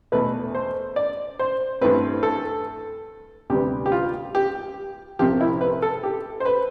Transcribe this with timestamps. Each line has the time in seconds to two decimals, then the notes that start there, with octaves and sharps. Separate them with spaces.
0.12 E2 B2 A3 B4
0.55 C5
0.96 D5
1.39 C5
1.81 G2 E3 A3 C4 B4
2.23 A4
3.50 D2 C3 G3 B3 G4
3.86 G4
3.92 F4
4.35 G4
5.19 C2 C3 F3 G4
5.41 E4
5.61 B4
5.82 A4
6.03 G4
6.40 C5
6.45 B4